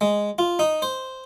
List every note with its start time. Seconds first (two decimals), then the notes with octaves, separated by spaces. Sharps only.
0.01 G#3
0.39 F4
0.59 D#4
0.82 C5